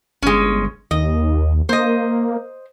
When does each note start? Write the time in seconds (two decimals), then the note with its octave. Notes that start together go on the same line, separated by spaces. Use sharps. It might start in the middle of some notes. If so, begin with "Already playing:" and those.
0.22 G1 G#3 C#4
0.91 D#2 D#5
1.69 A#3 C5 D#5